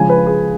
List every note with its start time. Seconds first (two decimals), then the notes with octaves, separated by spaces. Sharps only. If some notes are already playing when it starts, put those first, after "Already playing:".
Already playing: C#3 F3 G#3 G#5
0.09 B4
0.26 G#4